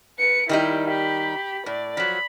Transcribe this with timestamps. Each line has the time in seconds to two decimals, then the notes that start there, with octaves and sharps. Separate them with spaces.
0.19 B4 C#7
0.49 D#3 G3 D#4 E4 G4
0.88 G4 B5
1.66 A2 D5
1.97 F3 F#3 B5